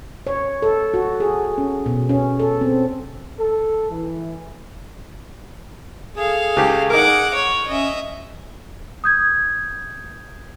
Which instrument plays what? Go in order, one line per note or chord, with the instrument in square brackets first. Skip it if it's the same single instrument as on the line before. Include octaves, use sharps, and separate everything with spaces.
[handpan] C#5
A4
F#4
G#4
C#4
B2
C#4
A4
C4
[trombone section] A4
E3
[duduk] G#4 [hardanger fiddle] A4 F5
[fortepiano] C#2 G4
[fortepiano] D#4 A#4 [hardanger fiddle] F#5 D6
[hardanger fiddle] C#5
[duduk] C#4 [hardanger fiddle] D#5 E5
[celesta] D#6 G6 G#6